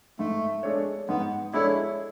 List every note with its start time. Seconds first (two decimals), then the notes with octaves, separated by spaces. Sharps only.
0.19 G#2 A3
0.63 G#3 D4 A4 C#5
1.08 G#2 B3
1.53 G#3 D4 E4 A4 C#5